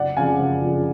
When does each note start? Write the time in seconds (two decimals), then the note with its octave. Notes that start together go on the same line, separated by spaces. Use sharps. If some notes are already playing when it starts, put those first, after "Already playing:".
Already playing: F#1 D5 F#5
0.17 F2 C#3 F3 F5 G#5
0.39 F#1
0.61 F2 C#3 F3